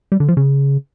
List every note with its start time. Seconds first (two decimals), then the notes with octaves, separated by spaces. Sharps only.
0.12 G3
0.20 D3
0.28 F3
0.37 C#3